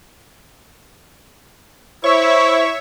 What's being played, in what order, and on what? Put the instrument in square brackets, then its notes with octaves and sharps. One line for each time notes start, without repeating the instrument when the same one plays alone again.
[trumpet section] E4 [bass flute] C5 [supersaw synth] C#5 E5 [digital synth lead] C#6